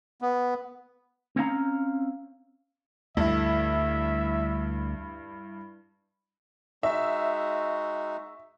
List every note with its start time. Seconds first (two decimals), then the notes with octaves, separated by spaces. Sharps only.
0.22 B3
1.36 C4 C#4 F5 A#5
3.17 D2 G2 A3 E4 E5
6.83 G#3 D#4 F#4 E5